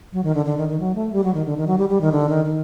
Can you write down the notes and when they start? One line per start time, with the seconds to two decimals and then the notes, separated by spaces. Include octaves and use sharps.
0.13 F#3
0.24 D#3
0.35 D3
0.46 D3
0.57 D#3
0.69 D#3
0.80 F#3
0.95 A3
1.12 G3
1.24 F#3
1.34 D#3
1.46 D3
1.57 D#3
1.67 F#3
1.78 G3
1.89 G3
2.01 D#3
2.12 D3
2.29 D#3
2.45 D#3